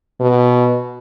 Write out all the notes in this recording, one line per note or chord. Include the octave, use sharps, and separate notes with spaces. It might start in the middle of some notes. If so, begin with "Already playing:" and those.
B2